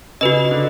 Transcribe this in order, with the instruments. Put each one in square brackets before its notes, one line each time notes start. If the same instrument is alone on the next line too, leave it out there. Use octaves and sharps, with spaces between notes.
[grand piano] C#3 [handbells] F#4 B4 D#5
[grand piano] D3